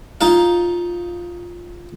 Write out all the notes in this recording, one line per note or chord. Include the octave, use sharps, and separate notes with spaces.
D#4 F4 F5